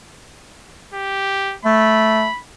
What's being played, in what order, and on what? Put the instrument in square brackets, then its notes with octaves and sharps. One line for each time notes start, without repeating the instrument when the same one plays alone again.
[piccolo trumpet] G4
[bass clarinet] A3 [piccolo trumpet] B5